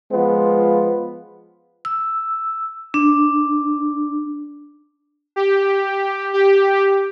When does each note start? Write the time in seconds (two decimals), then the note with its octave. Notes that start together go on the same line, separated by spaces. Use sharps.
0.12 F3 G#3 B3 F4
1.85 E6
2.94 D4
5.36 G4
6.33 G4